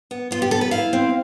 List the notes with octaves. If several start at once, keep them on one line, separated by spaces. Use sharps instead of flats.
B3
B3 F4
G4
B3 A4
B4
E4 F5
C4